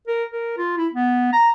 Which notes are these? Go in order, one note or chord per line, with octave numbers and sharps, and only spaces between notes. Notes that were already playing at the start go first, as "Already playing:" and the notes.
A#4
A#4
F4
E4
B3
A#5